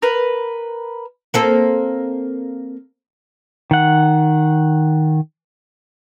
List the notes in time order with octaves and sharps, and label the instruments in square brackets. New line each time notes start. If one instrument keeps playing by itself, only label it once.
[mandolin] A#4 B4
[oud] A#3 C4 A4
[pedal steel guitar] D#3 F#5